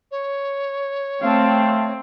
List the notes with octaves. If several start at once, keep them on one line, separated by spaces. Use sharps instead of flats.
C#5
A3 C4 F5 A5